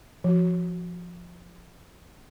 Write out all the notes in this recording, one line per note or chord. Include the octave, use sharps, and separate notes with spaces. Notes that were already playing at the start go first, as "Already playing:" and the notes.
F3 F#4